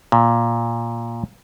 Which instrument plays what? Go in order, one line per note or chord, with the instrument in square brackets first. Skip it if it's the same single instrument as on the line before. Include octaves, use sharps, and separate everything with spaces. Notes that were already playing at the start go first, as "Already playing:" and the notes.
[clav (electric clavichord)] A#2